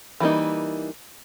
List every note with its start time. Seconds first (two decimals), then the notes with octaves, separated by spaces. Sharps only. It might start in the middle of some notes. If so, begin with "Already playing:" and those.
0.20 E3 G3 A#3 D#4